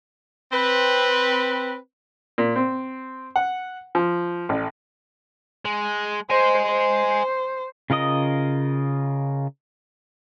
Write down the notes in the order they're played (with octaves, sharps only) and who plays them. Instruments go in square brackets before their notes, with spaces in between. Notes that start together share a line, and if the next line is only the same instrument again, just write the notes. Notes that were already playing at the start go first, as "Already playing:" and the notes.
[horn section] C4 B4
[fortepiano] A#2
C4
F#5
F3
A1
[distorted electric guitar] G#3
[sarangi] C5 [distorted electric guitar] D#5 G#5
[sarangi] C5
[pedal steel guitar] C#3 F4 A#4 D#5 D#6